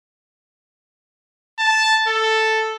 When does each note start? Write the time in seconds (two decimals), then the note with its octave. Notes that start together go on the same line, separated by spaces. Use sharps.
1.59 A5
2.08 A4